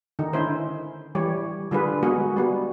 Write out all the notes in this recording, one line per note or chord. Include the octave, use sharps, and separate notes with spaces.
D3 D#3 D#4
C#4 E4 C5
E3 G3 G4 C#5
D3 G3 F4 G#4 A4 B4
G#3 B3 F#4 G#4 A#4
G3 B3 F#4